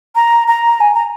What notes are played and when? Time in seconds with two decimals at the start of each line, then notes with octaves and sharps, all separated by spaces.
0.15 A#5
0.48 A#5
0.80 G#5
0.94 A#5